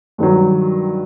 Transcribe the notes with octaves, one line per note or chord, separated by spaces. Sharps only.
G2 D#3 F#3